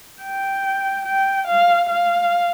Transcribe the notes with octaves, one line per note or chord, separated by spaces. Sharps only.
G5
G5
F5
F5